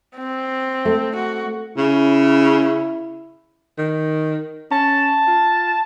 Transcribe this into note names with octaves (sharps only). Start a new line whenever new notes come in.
C4
A3
F#4
C#3 E4
D#3
C#4 A5
F4